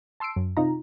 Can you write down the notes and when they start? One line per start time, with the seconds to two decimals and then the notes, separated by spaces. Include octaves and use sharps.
0.20 A5 C6 E6 C7 D7
0.36 F#2
0.57 C3 D#4 F4 A#5